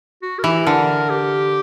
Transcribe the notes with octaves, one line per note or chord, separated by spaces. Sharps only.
F#4
A#4
E3 G4
D3 A#4
G4